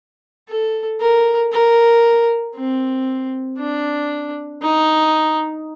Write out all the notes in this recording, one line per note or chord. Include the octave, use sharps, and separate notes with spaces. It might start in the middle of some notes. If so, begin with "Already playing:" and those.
A4
A#4
A#4
C4
D4
D#4